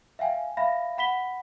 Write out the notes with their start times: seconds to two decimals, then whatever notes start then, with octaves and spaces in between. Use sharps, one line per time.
0.19 E5 F5 G5 G#5
0.57 E5 F5 B5 A#6
0.98 F#5 B5 B6 G7